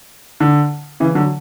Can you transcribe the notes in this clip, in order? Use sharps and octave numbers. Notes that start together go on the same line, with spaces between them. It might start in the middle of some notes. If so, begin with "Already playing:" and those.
D3
C#3 E3
D3 F#3